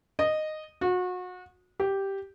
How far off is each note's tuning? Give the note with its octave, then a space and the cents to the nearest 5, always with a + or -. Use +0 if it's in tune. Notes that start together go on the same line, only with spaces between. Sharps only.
D#5 -10
F#4 -30
G4 -5